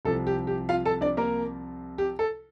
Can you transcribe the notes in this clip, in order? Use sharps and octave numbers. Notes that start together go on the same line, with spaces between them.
C2 C3 F3 A4
G4
G4
F4 F5
A4 A5
D4 D5
A#3 A#4
G4
A4